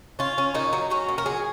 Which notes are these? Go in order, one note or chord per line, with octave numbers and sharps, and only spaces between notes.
C#4 F4
C#4
A#2 D#4
F#3
C#4 F#4
A#2
A#4
F#3 G#4